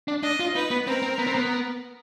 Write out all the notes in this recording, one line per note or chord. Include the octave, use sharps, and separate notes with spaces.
D4
D4 D#5
F4
D#4 B4
B3
C4 A#4
C4
B3
C4
B3